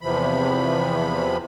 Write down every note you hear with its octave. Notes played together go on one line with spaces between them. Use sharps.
E2 C3 E3 F3 B5